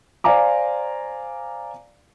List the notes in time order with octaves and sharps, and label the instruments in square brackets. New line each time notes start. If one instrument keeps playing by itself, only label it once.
[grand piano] C5 D5 F5 G#5 A#5 D6